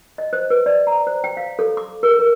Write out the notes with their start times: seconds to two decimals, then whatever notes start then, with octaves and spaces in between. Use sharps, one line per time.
0.18 D#5
0.33 C5
0.50 B4
0.66 D5
0.87 A#5
1.07 C5
1.24 G5
1.37 F5
1.59 A4
1.77 D6
2.03 A#4
2.19 A#4